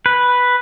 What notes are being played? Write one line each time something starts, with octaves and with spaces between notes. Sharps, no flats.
B4